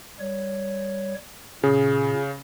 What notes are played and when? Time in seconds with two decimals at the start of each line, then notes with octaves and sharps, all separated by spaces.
0.20 G3 C#5
1.64 A#2 C#3 G#4